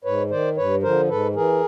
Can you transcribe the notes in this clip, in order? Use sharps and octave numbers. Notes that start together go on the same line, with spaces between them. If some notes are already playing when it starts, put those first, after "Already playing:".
G#2 B4 C#5
D#3 C5 D5
G2 B4 C#5
D3 F3 A#4 C5
G#2 A4 B4
E3 G#4 A#4